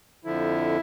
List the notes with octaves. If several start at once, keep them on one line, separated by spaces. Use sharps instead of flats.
F2 D3 F3 E4